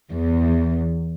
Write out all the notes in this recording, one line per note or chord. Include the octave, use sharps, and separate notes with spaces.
E2